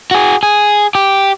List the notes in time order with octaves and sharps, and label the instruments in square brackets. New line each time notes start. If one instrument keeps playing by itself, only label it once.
[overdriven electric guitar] F#4 G#4
G#4
G4